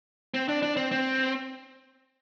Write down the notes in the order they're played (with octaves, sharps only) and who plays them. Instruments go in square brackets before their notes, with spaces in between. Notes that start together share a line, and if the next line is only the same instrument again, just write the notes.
[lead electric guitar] C4
D4
D4
C4
C4